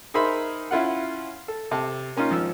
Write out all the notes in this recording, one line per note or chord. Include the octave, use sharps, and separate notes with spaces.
D#4 G#4 A#4 C5 E5 B5
C#4 E4 F4 F#5
A4
C3 A4 A5
A#3 C#4 D#4 F4
G#1 F3 E6